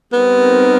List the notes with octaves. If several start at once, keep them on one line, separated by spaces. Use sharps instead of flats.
G3 B3 C4 D#4 G4 A#4